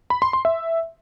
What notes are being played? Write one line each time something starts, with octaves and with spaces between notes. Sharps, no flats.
B5
C6
C6
E5